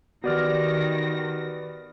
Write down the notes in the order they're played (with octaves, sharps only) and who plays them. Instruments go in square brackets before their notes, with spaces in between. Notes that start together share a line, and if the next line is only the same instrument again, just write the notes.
[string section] D#3 A#6 [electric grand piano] B3 D5 F6 [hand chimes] F#4 G4